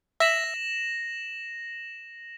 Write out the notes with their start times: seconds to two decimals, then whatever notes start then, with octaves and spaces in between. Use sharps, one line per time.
0.20 E5 A#6 B6 E7 F#7